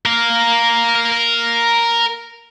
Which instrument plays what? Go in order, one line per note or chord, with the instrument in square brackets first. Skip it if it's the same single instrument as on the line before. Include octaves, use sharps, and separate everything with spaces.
[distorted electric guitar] A#4 F5